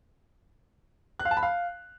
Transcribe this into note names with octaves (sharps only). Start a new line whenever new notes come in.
F#6
F5
A5
B5
F5